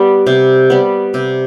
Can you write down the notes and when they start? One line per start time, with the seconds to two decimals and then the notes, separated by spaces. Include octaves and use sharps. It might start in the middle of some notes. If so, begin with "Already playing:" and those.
Already playing: G3 B3
0.27 C3
0.70 G3 B3
1.14 C3